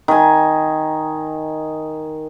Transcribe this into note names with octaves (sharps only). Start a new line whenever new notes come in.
D#3 G#5